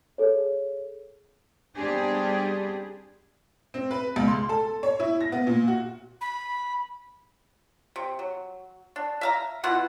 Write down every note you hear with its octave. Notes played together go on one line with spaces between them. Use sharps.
G#4 A4 C#5
G3 B3 C4 D4 G4 G#4
C4
B4
C#2
C6
A4
C#5
E4
A#6
B3
A#2
F#4
B5
C3
F#3
D4
E5 F5 A#5
B2 E4 F4 F#5